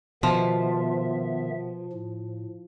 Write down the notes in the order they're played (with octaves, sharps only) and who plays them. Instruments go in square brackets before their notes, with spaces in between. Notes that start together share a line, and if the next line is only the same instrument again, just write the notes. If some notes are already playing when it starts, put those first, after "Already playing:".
[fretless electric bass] B2 [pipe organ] D#3 B3 E5 [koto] F3
[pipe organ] A2